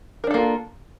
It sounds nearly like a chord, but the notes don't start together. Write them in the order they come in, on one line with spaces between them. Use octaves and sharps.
A#4 D4 A4 A#3 F4